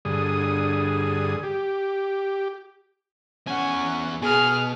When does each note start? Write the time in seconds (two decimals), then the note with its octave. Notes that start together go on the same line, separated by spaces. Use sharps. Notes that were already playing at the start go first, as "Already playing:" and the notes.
0.05 G2 D3 G#4 D#6
1.43 G4
3.47 E2 C#4 F#5 G#5
4.22 B2 G#4 F6